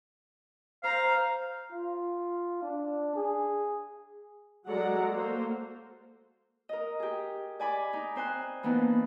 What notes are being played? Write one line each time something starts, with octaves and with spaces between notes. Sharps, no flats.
C5 F5 A#5
F4
D4
G#4
F#3 G#3 A4 D5 F#5 A#5
A#3 F#4 A4 C5
A#4 D#5
G4 G#4
D5 G#5 B5 D6
D#4
C4 C5 G#5 F#6
E3 A#3 B3 D4 D#4